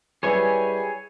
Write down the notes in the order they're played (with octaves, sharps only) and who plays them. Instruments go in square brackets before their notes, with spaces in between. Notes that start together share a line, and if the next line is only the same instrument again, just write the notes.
[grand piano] G3 E4 B4 [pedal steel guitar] G#4 C#5 G#5